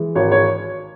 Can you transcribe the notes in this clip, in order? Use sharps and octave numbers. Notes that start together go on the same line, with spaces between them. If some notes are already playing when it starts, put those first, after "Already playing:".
Already playing: E3 G#3
G#1 C#5
C#5